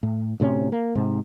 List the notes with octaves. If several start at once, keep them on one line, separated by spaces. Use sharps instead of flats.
A2
D2 A2 C3 C#4
A#3
G#2 C3